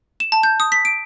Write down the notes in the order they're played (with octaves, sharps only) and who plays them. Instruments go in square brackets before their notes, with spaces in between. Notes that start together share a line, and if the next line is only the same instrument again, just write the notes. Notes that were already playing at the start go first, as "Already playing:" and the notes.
[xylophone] E7
A5
G6
D#6
B6
D7